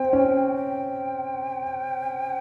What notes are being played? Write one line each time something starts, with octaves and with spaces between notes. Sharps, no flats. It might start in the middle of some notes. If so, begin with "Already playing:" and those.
Already playing: C4 G5
C#4
G5